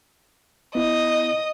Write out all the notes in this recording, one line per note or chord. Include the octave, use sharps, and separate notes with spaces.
B3 E4 D#5